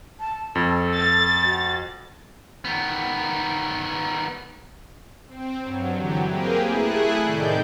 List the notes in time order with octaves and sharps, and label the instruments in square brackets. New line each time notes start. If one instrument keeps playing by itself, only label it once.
[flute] A5
[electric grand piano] F2 [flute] A4
[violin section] A6
[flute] F#4
[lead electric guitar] D#3 B3
[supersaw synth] C4
G2 F#3
D3 E3 F#3 G4
A#3 C4 G4 G#4 A#4 B4
A3 E4 G#4 F#6
A2 C3 D#3 G3 D5 G6